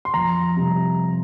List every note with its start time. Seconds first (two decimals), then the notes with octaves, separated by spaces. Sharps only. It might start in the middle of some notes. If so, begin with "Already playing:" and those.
0.05 C6
0.14 F2 A#5
0.56 C3 G3